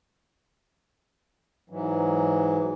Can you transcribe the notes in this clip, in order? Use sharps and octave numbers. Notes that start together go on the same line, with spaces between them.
G#2 E3 F#3